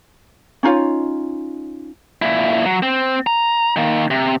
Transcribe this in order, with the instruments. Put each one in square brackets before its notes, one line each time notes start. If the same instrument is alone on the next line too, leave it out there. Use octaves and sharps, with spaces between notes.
[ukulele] C#4 D#4 F4 C#5
[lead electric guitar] A#2 E4
F#3
C4
A#5
D#3 A#3
C3